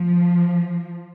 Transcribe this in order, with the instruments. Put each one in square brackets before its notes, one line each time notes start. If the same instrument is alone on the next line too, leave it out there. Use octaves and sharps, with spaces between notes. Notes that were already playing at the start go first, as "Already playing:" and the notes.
Already playing: [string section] F3